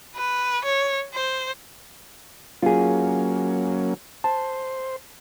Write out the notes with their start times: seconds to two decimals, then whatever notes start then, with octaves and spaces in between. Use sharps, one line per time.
0.16 B4
0.65 C#5
1.14 C5
2.62 F#3 A#3 C#4 F4 G#4
4.24 C5 A5